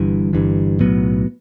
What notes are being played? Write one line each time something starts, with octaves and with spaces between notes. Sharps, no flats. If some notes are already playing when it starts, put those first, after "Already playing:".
Already playing: G1 G2 E3
G1 G2 E3
B1 A2 F#3 B3